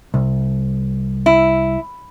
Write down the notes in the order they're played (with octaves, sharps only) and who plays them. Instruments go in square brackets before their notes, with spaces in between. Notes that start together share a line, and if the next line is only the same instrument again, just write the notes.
[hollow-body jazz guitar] C2
[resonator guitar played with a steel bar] E4